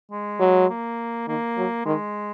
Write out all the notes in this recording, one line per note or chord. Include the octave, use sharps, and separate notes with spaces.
G#3
F#3
A#3
D#3 A#3
F#3
D#3 G#3